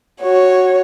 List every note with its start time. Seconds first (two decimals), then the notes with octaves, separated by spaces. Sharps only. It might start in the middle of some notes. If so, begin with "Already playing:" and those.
0.22 F#4 C#5